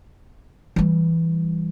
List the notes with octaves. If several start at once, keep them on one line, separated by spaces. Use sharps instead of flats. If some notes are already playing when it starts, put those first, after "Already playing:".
E3 G3